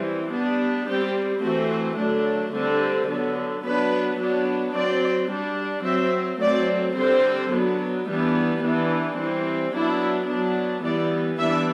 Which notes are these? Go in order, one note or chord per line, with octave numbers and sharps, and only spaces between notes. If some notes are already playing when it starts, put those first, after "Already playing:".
Already playing: E3 G3 C4
G3 B3 D4
G3 C4 G4
E3 A3 C4 F#4
D3 F#3 A3 D4
D3 G3 C4
D3 F#3 B3
F#3 B3 D4 B4
F#3 B3 D4
F#3 C4 D5
G3 D4
F#3 C4 E5
F#3 A3 C4 D5
D3 G3 C4 C5
F#3 B3 D4
E3 G3 B3 D4
E3 B3 D4
E3 G3 C4
F#3 B3 D4 E4
F#3 B3 D4
E3 G3 B3 D5
E3 G3 B3 D4 E5